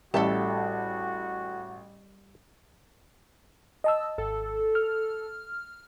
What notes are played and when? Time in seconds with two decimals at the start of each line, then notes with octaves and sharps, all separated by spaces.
0.14 A1 G3 F#4 A4 E5 A5
3.84 D#5 A5 E6
4.18 G#1 A4
4.75 F6